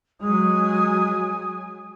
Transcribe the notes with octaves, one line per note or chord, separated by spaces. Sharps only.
F#3 G#3 G#5 D#6